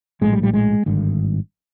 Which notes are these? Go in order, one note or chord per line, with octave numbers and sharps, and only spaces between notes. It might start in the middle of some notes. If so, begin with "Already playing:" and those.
A#1 A2 G#3
G3
G3
G#3
G#1 G2 D3